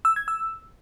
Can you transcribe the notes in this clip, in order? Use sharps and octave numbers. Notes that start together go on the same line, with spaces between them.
E6
G#6
E6